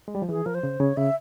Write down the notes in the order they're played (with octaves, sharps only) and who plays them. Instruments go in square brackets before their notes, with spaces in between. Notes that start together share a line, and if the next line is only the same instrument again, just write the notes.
[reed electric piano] G#3
G3
F3
[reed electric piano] E3 [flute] G#4
[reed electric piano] F3 [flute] A#4
[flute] C5
[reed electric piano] C#3
[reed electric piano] C#3 [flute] C#5
[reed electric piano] C#3 [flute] E5